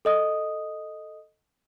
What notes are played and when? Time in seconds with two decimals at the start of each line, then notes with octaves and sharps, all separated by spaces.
0.05 A4 D#5 D#6